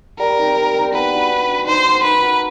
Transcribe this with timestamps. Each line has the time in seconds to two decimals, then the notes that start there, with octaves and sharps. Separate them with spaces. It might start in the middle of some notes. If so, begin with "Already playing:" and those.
0.19 G3 A#4
0.38 C4 D#4
0.56 G3
0.75 C4 D#4
0.93 B3 B4
1.12 D4 F#4
1.30 B3
1.49 D4 F#4
1.67 D#4 C5
1.85 F#4 A#4 D#5
2.03 D#4 B4
2.22 F#4 A#4 D#5